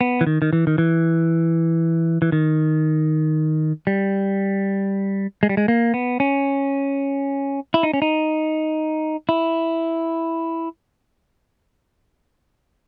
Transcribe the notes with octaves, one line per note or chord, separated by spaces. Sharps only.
B3
E3
D#3
D#3
E3
D#3
E3
E3
D#3
G3
G#3
G3
G#3
A#3
B3
C#4
E4
D#4
C#4
D#4
E4